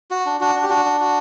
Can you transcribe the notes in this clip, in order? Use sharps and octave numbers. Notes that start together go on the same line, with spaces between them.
F#4
D4
D4 F#4
D4
G4
D4 F#4
D4
F#4